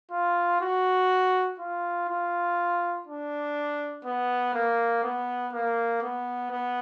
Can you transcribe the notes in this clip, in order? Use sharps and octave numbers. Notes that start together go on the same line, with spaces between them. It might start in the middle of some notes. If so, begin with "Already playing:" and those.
F4
F#4
F4
F4
D4
B3
A#3
B3
A#3
B3
B3